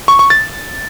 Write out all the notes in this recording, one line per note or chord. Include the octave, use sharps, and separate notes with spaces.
C#6
C#6
A6